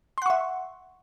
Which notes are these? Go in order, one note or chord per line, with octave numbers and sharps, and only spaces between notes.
E5 F#5 C6 C#6